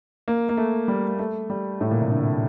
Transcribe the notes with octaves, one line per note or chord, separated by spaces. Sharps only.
A#3
A#3
A3
G3
A#3
A3
G3
A2
A#2
C3
D3